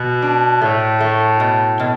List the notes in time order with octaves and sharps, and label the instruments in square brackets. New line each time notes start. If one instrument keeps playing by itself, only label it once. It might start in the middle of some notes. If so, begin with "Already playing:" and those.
Already playing: [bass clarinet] B2 [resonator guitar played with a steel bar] B3
[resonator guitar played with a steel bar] D4
[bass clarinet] A2 [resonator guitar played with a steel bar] A3
[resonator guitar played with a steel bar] A3
B2
B2